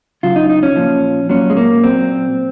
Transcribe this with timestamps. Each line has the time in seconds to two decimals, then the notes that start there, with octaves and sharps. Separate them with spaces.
0.23 C#3 F#3 F4
0.36 D#4
0.50 D#4
0.63 C#4
0.76 A#2 F3
1.29 A#2 F#3 C#4
1.50 G#3
1.57 A#3
1.84 A#2 F#3 C4